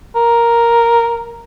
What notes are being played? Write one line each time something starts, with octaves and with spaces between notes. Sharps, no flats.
A#4